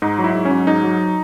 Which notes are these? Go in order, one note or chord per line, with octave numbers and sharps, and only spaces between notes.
G#2 D#4
F#3
E4
G#2
C#4
F#3
G#2 D#4
F#3